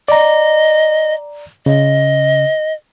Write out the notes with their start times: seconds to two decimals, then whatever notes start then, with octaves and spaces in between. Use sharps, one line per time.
0.08 D5 D#5 A#5
1.66 C#3 D#5